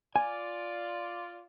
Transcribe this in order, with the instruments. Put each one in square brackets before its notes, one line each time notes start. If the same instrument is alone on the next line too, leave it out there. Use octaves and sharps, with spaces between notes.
[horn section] F4 D5 [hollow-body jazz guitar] G#5